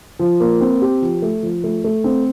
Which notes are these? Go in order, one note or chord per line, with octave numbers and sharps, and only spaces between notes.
F3
A#3
C4
G4
F3
A3
F3
A3
A3
C4